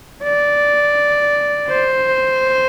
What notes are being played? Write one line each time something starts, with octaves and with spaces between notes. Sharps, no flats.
D5
C5